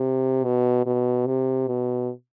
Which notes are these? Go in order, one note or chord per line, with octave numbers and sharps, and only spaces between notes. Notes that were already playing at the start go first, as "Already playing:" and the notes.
Already playing: C3
B2
B2
C3
B2